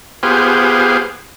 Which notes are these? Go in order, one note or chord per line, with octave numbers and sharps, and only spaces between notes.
B3 F4 G4 G#4 C5